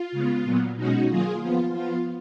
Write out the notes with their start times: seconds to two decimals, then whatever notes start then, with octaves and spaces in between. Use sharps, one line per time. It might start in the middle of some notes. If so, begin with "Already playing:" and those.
Already playing: F4
0.12 C#3 G#3 B3
0.44 A#2 F#3 B3
0.76 B2 G#3 C#4 D#4 F#4
1.08 D#3 F#3 A#3 F4 G#4
1.40 F3 B3 F4
1.72 F3 B3 F4